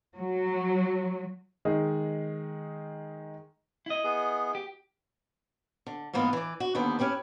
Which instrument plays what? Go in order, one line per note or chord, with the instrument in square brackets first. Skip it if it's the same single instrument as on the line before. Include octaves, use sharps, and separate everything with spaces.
[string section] F#3
[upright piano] D#3 G#3 D#4 G#4
[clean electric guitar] E4 D#5
[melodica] B3 G#4
[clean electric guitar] G4
[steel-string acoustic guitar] D3
G#2 E3 A#3 B3 F4
E3 D5
F#4
D#2 D3 B3 C5
C#4 E4 G4 B4